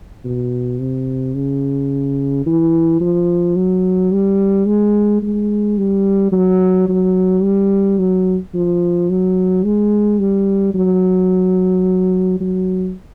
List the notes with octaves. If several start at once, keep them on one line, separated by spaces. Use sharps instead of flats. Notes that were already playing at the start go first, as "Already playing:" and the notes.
B2
C3
C#3
E3
F3
F#3
G3
G#3
G#3
G3
F#3
F#3
G3
F#3
F3
F#3
G#3
G3
F#3
F#3